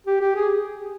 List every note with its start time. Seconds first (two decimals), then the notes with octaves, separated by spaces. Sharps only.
0.07 G4
0.21 G4
0.36 G#4